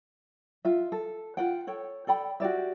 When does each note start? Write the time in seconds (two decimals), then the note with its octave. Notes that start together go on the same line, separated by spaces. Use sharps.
0.65 F4 E5
0.92 A4
1.37 F4 F#5 G5
1.67 A4 C#5 G5
2.07 A4 D5 G5 B5
2.40 F#4 G4 D5 E5